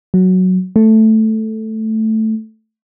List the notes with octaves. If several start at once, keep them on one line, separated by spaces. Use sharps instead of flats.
F#3
A3